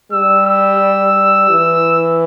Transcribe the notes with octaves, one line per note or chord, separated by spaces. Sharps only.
G3 E6
E6
E3